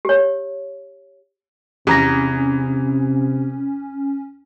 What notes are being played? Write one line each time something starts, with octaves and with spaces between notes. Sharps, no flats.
G4 C#5
E2 C3 C#4 G4 A#5 A#6